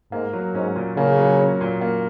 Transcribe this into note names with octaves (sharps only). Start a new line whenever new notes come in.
G#2 A#3
F#3
G#2 C#4
A#2
C#3 A#3
F#3
C#4
A#2
A#3